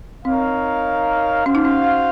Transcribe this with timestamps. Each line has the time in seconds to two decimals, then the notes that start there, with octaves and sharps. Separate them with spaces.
0.25 C4 D#4 A#4 C#5 F5
1.46 C#4 F#4 C5 F5
1.55 D#4
1.65 C#4